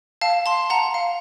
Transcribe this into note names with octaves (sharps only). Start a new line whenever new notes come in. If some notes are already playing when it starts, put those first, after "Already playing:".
F5 A5
A5 C6
F#5 A#5
F5